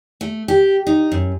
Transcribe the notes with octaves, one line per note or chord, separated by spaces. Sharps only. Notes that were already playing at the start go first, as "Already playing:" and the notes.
A3
G4
D#4
F#2